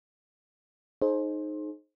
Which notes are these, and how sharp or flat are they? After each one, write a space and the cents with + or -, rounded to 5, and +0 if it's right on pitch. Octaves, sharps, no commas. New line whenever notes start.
D#4 -10 G#4 +35 C5 +20